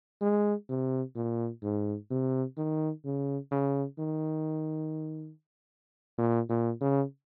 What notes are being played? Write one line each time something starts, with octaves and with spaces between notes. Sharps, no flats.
G#3
C3
A#2
G#2
C3
D#3
C#3
C#3
D#3
A#2
A#2
C#3